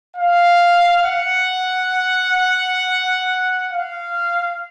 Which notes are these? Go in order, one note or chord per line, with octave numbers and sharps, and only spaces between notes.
F5
F#5
F5